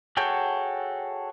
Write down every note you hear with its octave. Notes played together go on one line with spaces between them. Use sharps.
F#4 G#4 A4 C#5 G5